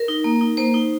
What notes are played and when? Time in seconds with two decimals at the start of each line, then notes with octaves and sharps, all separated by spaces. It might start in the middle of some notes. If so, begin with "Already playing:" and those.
Already playing: A#4
0.08 D#4
0.24 A#3
0.41 D#4
0.57 A#3 C5
0.74 D#4